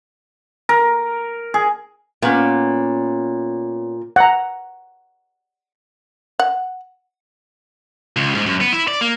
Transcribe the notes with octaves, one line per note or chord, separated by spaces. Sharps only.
A#4
G#4
A#2 B3 C#4
F#5 A#5
F#5
C#2
G#2
F#2
B3
E4
D5
A#3